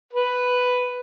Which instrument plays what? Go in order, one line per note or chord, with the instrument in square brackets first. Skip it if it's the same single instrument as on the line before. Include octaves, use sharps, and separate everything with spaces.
[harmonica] B4